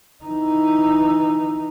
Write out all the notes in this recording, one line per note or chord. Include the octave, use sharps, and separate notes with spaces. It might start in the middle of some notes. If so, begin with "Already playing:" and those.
E3 D#4